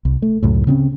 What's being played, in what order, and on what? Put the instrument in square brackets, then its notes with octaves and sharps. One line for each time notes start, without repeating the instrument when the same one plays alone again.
[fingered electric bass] C2
A3
C#2 F#2 A2
C#3 C4 C#4